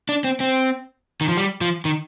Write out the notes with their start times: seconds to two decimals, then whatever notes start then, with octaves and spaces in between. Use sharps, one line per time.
0.09 D4
0.24 C4
0.40 C4
1.21 D#3
1.28 F3
1.37 G3
1.61 F3
1.85 D#3